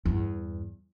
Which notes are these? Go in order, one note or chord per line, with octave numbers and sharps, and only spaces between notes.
E2 G2